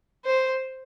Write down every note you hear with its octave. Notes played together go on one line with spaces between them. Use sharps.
C5